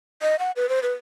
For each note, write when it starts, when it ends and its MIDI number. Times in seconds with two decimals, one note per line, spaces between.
0.22 0.36 75
0.39 0.51 78
0.56 0.69 71
0.69 0.80 72
0.83 0.93 71